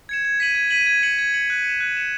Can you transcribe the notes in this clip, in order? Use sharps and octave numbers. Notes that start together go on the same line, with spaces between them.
G#6 C#7 E7
G#6
B6 D#7 F#7
G#6
B6 D#7 F#7
G#6
C#7 F#7
G#6
C#7 F#7
F#6
C#7 E7
F#6
C#7 E7